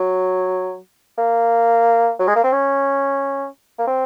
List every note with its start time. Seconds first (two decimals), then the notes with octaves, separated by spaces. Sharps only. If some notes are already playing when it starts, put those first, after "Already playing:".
Already playing: F#3
1.18 A#3
2.19 F#3
2.27 G#3
2.36 A#3
2.44 C4
2.53 C#4
3.79 A#3
3.87 C4